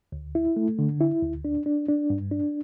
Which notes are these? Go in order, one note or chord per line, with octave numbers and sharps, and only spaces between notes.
D2
E4
A3
D3
E4
D2
D4
D4
D4
G2
D4